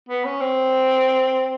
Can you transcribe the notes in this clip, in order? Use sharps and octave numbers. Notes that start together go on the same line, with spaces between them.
B3
C#4
C4